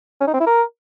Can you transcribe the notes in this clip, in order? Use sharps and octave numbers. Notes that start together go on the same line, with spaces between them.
C#4
D#4
C4
E4
A#4